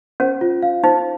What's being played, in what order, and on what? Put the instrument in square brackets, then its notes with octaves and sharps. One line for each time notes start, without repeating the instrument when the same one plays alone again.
[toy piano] C#4 [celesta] C5
[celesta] F4
F5
[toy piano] D#4 [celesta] C5